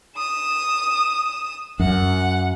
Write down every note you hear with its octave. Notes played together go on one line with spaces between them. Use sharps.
D#6 E7
F#2 F#5